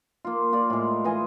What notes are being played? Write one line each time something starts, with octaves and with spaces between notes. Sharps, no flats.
A#3 F4
A#3 F4 D5
A2 G#3
E3 F4 D#5 G#5